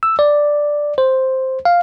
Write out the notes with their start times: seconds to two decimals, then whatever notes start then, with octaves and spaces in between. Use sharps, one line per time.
0.03 E6
0.19 D5
0.98 C5
1.65 F5